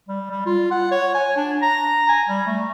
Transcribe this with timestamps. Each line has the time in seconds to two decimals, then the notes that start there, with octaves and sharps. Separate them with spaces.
0.09 G3
0.30 G3
0.46 F4
0.71 F#5
0.92 C#5
1.14 G#5
1.36 D4
1.62 A#5
2.09 G#5
2.29 G3
2.47 A3